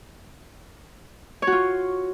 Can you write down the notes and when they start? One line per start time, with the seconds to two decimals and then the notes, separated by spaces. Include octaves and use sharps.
1.42 C#5
1.47 F#4
1.52 F4